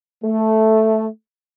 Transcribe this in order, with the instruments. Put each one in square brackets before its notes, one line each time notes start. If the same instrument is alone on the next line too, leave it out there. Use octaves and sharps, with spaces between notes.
[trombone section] A3